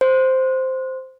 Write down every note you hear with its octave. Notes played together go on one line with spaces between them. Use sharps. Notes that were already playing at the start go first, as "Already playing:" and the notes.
C5